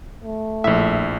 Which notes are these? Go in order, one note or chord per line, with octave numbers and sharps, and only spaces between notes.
A3
A#1 A2 E5